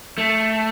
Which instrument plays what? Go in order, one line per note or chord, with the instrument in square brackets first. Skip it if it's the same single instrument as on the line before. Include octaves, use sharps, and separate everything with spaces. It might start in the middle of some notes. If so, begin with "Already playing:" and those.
[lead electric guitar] A3